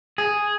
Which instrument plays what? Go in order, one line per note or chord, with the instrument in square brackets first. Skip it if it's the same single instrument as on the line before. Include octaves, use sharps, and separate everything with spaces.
[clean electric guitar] G#4